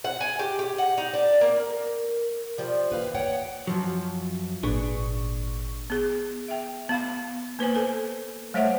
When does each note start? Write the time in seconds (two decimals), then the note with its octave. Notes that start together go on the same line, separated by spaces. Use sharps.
0.04 F#5
0.21 G#5
0.39 G4
0.59 G4
0.78 F#5
0.98 D#4
1.14 D4
1.41 A#3
1.70 A#4
2.58 F3 G3
2.92 D#2 B4 F5
3.15 C#5 F#5 G5
3.67 F#2 F3 F#3
4.63 G#1 A#2 D4 G#4 B4 C#6
5.90 B3 G#4
6.48 E5 G5
6.89 B3 F5 B5
7.59 A#3 B4 C5 G#5
7.76 A4 B4
8.54 G3 A3 C5 C#5 E5 F#5